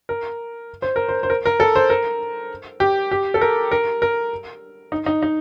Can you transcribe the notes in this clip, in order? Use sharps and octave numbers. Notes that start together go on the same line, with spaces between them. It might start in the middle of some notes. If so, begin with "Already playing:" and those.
A#4
C5
A#4
C5
C5
A#4
A#4
A4
C5
A#4
G4
G4
A4
A#4
A#4
A#4
D#4
D#4
D#4